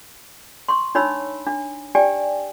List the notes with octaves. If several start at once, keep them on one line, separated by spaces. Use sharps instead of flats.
C6 C#6
D4 D#4 C#5 B5 E6
D4
G4 D5 G5 G#5